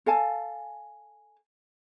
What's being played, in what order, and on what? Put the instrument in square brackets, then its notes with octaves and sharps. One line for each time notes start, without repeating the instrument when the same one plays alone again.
[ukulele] A4 F5 G#5 A5